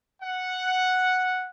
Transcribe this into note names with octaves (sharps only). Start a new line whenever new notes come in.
F#5